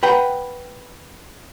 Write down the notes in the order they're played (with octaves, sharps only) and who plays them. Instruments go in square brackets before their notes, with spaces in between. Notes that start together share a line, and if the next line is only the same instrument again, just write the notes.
[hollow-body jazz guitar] B4 F#5 G5 A#5